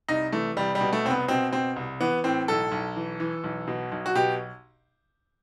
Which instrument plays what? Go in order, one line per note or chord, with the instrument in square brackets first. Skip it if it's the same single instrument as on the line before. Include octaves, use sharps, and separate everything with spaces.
[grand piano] C2 D#4
E3 A3
C2 G3
G3
B2
A3
C2 C4
B3
B2 C4
B2 C4
C2
E3 B3
A2 C4
B1 A4
B1
E3
E3
B1
B2
B1
F#4
B2 G4